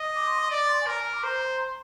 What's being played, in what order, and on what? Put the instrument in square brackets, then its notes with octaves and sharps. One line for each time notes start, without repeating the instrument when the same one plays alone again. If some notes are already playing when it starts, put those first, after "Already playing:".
Already playing: [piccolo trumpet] D#5
[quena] D6
C6
D#6
[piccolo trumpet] D5 [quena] D6
[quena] C6
G#5
[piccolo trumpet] A#4 [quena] A#5
[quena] G#5
A#5
D6
[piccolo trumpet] C5 [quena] C6
[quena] A#5
A#5
C6